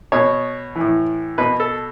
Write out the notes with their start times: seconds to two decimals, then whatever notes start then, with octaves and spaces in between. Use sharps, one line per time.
0.12 B2 C#5
0.76 A2 E3
1.38 B2 B4
1.60 A4